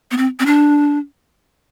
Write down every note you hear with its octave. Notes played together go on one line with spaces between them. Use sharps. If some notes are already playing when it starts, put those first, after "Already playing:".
B3
C4
C4
D4